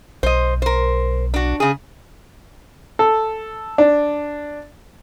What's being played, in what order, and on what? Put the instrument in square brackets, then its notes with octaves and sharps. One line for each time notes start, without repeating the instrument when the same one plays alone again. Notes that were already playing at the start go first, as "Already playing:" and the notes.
[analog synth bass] B1 [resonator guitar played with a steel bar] C5 D#5
[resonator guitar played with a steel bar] A#4 C5
D4 F#4
C#3 G#4
[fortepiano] A4
D4